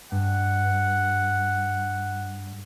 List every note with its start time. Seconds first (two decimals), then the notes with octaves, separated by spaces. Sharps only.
0.12 G2 F#5